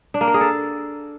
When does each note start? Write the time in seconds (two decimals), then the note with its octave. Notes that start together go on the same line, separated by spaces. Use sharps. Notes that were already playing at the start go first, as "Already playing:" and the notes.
0.14 D4
0.21 A#3
0.28 A#4
0.34 G#4
0.41 A4